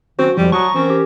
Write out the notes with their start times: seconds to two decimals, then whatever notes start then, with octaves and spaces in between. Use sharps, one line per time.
0.19 D#3 F#3 C4 C#4 F#4
0.37 F2 F3 G3 G#3 E4
0.52 F#3 A5 A#5 C#6 D#6
0.75 E3 C4 C#4 A#4
0.90 G4